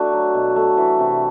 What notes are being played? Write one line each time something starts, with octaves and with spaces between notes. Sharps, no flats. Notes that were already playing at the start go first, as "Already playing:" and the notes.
Already playing: A3 D4 F#4
F#3
B2
A3
E3
C3